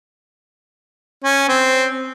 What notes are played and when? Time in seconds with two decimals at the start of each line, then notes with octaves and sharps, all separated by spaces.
1.24 C#4
1.48 C4